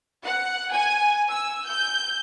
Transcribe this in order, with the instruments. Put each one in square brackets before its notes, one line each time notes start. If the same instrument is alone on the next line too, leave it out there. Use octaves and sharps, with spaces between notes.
[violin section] F#5
G#5
E6
G6